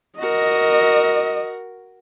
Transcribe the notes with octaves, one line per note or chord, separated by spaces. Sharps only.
F#4 A#4 D#5